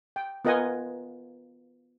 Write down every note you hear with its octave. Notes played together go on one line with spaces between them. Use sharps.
G5
B3 F4 A#4 D#5 F#5 G#5